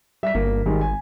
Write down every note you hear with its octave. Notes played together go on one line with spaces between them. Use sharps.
G3 E5 B6
G1 A#3
G#1 D#3 G3 G#3
G#5